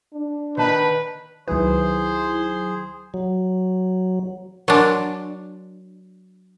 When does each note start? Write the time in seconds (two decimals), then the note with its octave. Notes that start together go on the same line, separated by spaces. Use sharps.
0.13 D4
0.57 D#3 B4 A5
1.48 C#2 D#3 F#3 E4 G#4 B4 C5
3.14 F#3
4.68 F#3 D4 A#4 G#5 C6